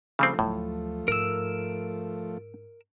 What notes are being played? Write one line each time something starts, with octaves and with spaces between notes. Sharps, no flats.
C#3 F3 G3 A3 C4
D2 A2 F#3
G#2 A#4 E6